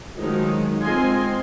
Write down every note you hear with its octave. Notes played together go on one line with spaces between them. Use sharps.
D#3 F3 F#3 G#3 D#4
G#3 C4 F4 D#5 G#5 C6